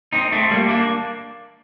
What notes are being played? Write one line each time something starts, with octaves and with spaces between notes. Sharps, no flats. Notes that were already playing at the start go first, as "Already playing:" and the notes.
C4 D#4
A3 C4
G3 A#3
A#3 D4